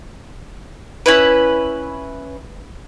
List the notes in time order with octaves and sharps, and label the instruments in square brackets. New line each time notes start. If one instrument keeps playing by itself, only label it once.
[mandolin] C#4 E4 B4